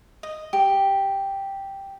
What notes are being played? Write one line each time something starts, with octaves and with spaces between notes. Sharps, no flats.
D#5
G4